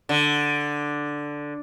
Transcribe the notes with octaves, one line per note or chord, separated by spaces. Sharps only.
D3